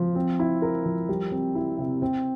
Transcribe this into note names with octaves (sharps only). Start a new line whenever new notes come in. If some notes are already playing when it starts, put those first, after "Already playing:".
Already playing: F3
C4
E4
A#4
F3
G3
C4
E4
C3
C4